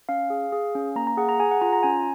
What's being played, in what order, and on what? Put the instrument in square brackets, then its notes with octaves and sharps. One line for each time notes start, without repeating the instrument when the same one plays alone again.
[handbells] C#4 F5
G#4
G#4
C#4
A#3 A#5
A#5
G#4 F#5
A#5
G#4 G#5
F#5
F4 A#5
A#5
C#4 G#5